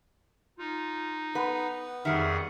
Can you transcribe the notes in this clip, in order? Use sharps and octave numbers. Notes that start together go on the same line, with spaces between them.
D#4 F4
B3 B4 F#5
F2 D#3 G3 G#4 E5 F#5